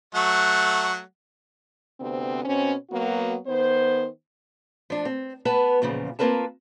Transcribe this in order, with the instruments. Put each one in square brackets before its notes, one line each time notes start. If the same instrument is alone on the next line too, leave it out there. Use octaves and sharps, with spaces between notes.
[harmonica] F#3 A3 F#5
[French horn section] D2 C3 B3 C4
B2 C4 C#4
F#3 A#3 B3 F#4
D#3 B3 C5
[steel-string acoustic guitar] F3 D4
C4
B3 B4 A5
E2 A#2 C#3 F3
A#3 C4 F4 A#4 B4 A5